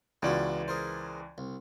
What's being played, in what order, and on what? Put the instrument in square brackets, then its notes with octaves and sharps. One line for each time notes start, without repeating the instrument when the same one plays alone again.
[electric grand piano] C#2 E3 D5 [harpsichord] B3 F4 F#4
[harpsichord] G#4 A#4 C5
C2